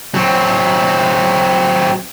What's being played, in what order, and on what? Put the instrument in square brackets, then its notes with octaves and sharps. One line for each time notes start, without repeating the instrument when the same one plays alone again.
[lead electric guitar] F#3 C4